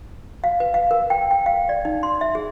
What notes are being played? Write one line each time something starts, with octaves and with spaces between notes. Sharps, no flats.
F5
B4
F5
A#4
G5
G5
F5
D5
D#4
C6
E5
G#4